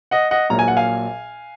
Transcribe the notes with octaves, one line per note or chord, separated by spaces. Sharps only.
D#5 F#5
D#5 F#5
A#1 A#2 F#3 A#5
G#5
F#5
F5 G#5